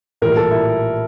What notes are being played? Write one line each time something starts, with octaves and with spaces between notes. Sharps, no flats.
A#1 A2 E3 G3 A#4
A4
E4